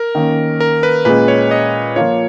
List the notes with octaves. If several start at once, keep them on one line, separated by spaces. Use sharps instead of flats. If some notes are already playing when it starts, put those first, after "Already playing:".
Already playing: A#4
D#3 A#3 C#4
A#4
B4
A#2 G#3 C#4 B4
C#5
D#5
F3 A#3 F4 C#5